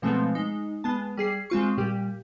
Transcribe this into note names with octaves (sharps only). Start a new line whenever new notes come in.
B2 F3 G#3 A3 B3 C4
G#3 D#4
G#3 B3 A5
G3 G#4 C7
G#3 C4 F4 C#6
A#2 G3 G4